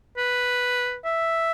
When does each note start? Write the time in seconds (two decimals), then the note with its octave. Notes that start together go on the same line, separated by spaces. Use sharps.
0.17 B4
1.05 E5